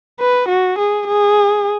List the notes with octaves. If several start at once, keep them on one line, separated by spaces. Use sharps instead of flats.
B4
F#4
G#4
G#4